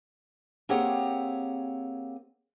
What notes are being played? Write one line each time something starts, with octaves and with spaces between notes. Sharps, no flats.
A#3 C4 G4 G#4 C#5 F#5